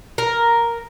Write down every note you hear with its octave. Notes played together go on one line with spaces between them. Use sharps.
A#4